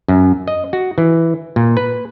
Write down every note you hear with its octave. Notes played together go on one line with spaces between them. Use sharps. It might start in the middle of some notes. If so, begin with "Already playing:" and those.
F#2
D#5
F#4
E3
A#2
B4